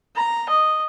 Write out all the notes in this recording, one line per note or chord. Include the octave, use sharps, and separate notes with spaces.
A#5
D#5